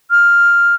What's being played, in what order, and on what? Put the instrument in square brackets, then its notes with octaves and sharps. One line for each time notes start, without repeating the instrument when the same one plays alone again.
[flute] F6